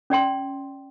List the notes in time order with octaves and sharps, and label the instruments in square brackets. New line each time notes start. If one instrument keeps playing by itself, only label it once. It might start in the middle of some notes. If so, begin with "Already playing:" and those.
[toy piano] C#4 D5 G5 C6